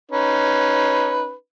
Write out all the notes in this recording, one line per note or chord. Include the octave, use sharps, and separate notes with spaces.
C#4 D#4 B4